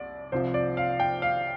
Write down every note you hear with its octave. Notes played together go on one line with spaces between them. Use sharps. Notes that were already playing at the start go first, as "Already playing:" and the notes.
Already playing: C2 D5
C2 C3 F3 C5
D5
F5
G5
F5